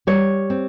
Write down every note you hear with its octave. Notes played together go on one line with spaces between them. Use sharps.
G3 C#5
C4